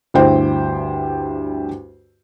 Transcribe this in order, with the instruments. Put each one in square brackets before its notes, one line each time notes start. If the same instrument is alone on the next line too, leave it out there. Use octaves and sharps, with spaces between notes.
[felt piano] D2 G2 E4 G4 C5 G5